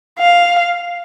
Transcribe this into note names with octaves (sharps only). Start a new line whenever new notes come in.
F5